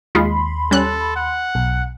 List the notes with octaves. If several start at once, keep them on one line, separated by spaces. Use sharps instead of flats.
D#2 G#3 D#4 F4 B5 C6
G3 C#4 A4 F#6
F#5
B1